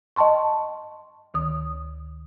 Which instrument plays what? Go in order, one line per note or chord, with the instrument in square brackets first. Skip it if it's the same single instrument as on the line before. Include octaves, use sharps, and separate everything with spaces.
[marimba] D#5 G5 A5 C6 C#6
D2 D#3 D#6